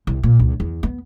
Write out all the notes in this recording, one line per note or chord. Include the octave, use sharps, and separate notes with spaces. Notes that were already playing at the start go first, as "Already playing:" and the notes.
C2
A#2
C#2
E2
B3